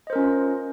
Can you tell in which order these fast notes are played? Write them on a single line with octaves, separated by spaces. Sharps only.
D#5 C5 A#4 C#4 F4